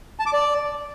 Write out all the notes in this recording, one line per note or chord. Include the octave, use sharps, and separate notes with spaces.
A5
D6
D5